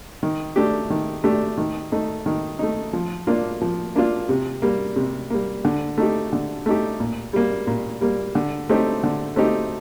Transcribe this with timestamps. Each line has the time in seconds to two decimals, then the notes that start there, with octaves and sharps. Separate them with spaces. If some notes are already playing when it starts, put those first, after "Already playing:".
0.23 D#3
0.56 A3 D4 G4
0.90 D#3
1.24 A3 D4 G4
1.57 D#3
1.92 A3 D#4
2.26 D#3
2.59 A3 D#4
2.93 F3
3.27 A#3 D4 F4
3.61 F3
3.96 A#3 D4 F4
4.29 C3
4.62 G3 A#3
4.96 C3
5.30 G3 A#3
5.65 D3
5.98 A3 D#4 G4
6.33 D3
6.66 A3 D#4 G4
7.00 A#2
7.33 G3 A#3
7.67 A#2
8.01 G3 A#3
8.35 D3
8.69 A3 C4 D#4 G4
9.03 D3
9.36 A3 C4 D#4 G4